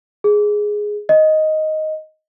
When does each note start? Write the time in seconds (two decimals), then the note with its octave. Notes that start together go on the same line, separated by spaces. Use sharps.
0.24 G#4
1.09 D#5